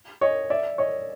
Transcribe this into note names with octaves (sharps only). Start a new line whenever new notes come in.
C#5 D#5
D5 E5
C#5 D#5